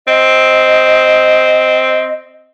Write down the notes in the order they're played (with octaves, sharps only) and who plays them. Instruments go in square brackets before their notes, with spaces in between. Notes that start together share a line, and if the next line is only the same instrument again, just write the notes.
[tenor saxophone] C4 [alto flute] D#5